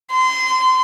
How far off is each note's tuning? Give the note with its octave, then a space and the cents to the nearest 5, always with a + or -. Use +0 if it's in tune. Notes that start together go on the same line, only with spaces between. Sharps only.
C6 -25